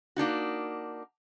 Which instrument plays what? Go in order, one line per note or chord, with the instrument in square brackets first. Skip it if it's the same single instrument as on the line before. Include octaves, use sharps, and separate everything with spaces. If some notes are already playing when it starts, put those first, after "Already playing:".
[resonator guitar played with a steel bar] A#3 D4 D#4 F#4